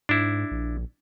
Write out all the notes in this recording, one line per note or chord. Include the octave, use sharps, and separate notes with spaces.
G#2 D4 E4
A#1